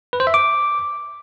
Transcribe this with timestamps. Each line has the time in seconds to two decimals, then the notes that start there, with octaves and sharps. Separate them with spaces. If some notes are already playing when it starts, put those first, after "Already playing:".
0.13 B4
0.20 C5
0.27 E5
0.34 D6